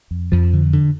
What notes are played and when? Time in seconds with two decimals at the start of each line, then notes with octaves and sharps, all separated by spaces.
0.11 F2
0.32 F2 F3
0.53 D3
0.73 D3